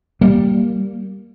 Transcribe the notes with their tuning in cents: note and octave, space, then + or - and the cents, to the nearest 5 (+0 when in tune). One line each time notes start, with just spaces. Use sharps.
G3 -10 A#3 +0